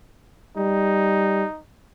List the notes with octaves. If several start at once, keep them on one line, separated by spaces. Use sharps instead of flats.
G3 D#4